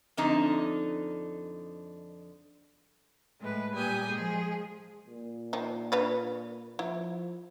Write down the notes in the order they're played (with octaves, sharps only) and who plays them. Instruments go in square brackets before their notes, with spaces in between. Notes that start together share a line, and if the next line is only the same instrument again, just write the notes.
[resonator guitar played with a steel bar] F2 D3 D#4
[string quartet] A2 G#3 A3 B4
A#2 G3 G4 G#5 D#6 G6
F3 G#3 G#4
[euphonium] A#2
[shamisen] D#3 F3
D4 B4 D5
[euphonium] F3 [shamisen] E4